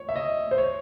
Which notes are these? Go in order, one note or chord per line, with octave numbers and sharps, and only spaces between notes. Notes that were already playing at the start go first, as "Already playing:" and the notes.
Already playing: C#5
E5
D#5
C5
C#5